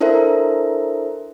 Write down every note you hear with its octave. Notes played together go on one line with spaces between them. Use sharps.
D4 E4 A4 A#4 C5 E5